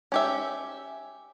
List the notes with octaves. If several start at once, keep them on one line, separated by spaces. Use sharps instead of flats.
C#4 G4 E5